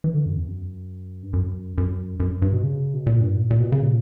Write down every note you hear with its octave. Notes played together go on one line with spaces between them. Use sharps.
E3
D3
F#2
E2
F#2
G2
F#2
F#2
F#2
G2
B2
C#3
B2
A#2
G2
A#2
A#2
B2
C#3
A#2